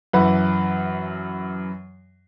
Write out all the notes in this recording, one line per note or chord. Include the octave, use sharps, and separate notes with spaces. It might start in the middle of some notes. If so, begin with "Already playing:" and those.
F#2 E3 B4 F#5